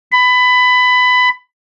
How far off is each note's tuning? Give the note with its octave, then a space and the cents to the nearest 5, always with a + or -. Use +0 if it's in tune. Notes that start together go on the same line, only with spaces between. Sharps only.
B5 +20